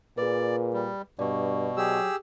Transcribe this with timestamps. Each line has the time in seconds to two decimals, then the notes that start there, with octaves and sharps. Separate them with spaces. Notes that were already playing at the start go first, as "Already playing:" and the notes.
0.18 A#2 G#4 B4 D5
0.73 G3
1.19 G2 B2 D5 C#6
1.77 F#3 G4 G#4 E6